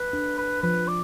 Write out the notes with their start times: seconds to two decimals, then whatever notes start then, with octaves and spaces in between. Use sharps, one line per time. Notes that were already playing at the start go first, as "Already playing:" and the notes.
Already playing: B4
0.13 D4
0.38 B4
0.62 F3 B4
0.88 D5